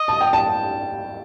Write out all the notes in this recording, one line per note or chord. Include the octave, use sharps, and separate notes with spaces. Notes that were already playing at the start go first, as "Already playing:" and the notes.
Already playing: D#5
A5
G5
A5